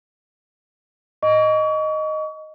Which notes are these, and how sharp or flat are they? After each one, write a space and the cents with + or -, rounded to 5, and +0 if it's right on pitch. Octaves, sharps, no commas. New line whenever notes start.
D#5 -5 C#6 +35